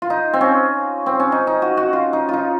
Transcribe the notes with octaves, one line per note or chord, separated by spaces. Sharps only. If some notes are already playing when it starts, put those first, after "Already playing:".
F4
D#4
C4
C#4
C4
C#4
D#4
D#4
F#4
F#4
F4
D#4
D#4 F4